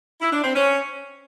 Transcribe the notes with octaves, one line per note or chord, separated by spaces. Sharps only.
E4
D4
C4
C#4